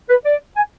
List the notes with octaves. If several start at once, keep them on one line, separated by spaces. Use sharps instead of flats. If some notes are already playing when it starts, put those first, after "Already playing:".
B4
D5
G#5